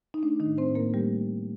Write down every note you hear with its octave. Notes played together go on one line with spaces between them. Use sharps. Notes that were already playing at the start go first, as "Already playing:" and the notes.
D#4
A3 D4
D#3 D#4
A2
C4 C5
A2
A#3 A#4
G3 A3 G4